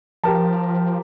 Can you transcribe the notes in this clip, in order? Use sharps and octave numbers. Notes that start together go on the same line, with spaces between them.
F3 G4 A#4 A5